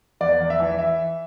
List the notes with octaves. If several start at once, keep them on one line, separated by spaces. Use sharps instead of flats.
E2 D5
E2
E5
E3
E5